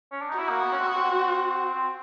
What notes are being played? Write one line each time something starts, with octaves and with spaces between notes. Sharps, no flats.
C#4
D4
D#4
E4 F#4
A#3
B3
C#4
C4
B3
C4
C4